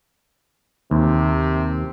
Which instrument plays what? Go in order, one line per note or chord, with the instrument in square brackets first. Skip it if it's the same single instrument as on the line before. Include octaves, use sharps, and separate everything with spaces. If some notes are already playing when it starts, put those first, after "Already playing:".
[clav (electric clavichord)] D#2 [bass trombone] C3